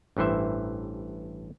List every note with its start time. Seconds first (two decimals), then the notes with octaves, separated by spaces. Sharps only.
0.17 A1 G2 E3 C5 E5